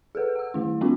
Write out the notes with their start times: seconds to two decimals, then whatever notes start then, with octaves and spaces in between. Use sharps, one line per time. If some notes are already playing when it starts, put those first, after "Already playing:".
0.15 G#4 A4 B4 F#5
0.36 F#5 E6
0.54 D#3 A3 E4
0.81 G3 B3 C#4 D#4 F4 F#4